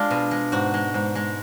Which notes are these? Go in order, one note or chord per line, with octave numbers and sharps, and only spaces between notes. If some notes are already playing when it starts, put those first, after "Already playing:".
Already playing: G#3 D4 F4
B2
G#3
G#2 F#4
G#3
G#2
G#3